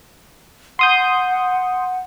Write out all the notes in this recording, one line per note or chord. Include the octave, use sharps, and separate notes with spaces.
F#5 C6 D#6 G6